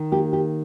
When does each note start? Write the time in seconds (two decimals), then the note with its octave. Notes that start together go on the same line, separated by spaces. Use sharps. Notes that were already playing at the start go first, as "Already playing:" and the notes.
Already playing: D#3
0.12 A#3 G4
0.33 G4